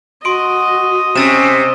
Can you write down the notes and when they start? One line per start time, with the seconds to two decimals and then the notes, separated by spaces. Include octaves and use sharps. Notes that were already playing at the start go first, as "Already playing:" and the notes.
0.25 F#4 D#5 C6 D7
1.15 C3 C#4 E6 A6 E7